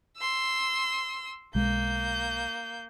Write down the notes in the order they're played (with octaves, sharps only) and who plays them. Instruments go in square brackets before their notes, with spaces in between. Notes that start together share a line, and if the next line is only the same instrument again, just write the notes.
[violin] C6 E6
[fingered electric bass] B1 G#3 [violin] A#3 G6